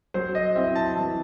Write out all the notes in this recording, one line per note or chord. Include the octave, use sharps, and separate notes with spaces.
F#3 C5
D#5
C4 E4 E5
A5
E3